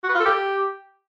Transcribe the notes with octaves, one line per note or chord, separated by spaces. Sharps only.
F#4
B4
F4
A4
G4